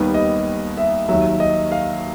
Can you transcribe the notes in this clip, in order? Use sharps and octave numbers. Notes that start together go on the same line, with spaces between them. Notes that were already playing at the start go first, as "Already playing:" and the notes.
Already playing: D#2 D#3 G3 B3
D#5
E5
D#2 D#3 F#3 E5
D#5
F5